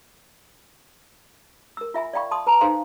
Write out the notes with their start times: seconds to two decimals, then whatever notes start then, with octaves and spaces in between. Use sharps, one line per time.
1.77 A#4 E6
1.94 F4 E5 G#5 B5
2.13 D5 F5 G5 B5 C#6
2.31 A5 C6 D#6
2.47 B4 A5 A#5
2.61 D#4 A4 C5 F5 G#5 C6